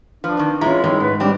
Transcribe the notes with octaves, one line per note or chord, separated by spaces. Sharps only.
F3 D4 B4
D#3 C4
E3 G#3 C#4 E4 F4 A#5
D#3 G3 G#3 C#4 E4
G#2 B4
G3 C4 D4 G4